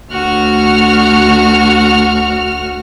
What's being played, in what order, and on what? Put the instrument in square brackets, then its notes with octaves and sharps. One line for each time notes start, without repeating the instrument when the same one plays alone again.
[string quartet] D2 F#4 F6